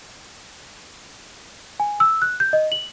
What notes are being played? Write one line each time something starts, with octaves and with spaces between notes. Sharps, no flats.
G#5
E6
F#6
G6
D#5
F#7